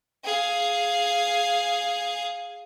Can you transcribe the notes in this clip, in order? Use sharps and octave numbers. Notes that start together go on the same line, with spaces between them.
G#4 F5